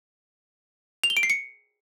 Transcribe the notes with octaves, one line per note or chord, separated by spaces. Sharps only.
F7
G7
D7
C7
C#7